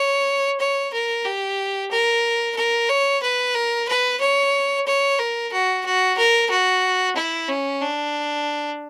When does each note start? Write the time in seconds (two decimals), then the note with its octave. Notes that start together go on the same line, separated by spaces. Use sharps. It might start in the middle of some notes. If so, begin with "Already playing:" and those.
Already playing: C#5
0.60 C#5
0.93 A#4
1.25 G4
1.91 A#4
2.56 A#4
2.89 C#5
3.22 B4
3.55 A#4
3.88 B4
4.20 C#5
4.86 C#5
5.19 A#4
5.52 F#4
5.85 F#4
6.18 A#4
6.50 F#4
7.16 E4
7.49 C#4
7.81 D4